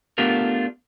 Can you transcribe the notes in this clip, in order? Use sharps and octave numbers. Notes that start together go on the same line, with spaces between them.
A3 B3 D4 F4 G4 A#4